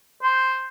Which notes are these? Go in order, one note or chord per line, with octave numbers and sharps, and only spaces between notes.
C5